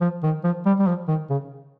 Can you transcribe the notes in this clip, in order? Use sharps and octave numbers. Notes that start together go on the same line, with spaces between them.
F3
D#3
F3
G3
G3
F3
D#3
C#3